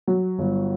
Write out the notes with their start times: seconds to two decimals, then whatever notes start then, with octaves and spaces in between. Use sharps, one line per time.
0.08 F#3
0.39 G1